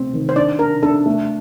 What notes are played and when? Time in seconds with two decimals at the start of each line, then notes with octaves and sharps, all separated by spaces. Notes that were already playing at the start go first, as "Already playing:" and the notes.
Already playing: A3 C4
0.13 D#3
0.29 C5
0.36 D4 D5
0.59 D4 A#4
0.83 D4 A4
1.06 A3